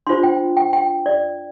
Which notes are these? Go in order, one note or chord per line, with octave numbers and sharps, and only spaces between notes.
D4 F4 C5 C6
G5
G5
G5
D5